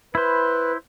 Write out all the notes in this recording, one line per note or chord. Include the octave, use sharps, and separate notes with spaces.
E4 B4 C5